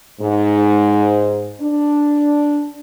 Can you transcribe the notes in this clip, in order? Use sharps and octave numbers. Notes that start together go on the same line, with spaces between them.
G#2
D4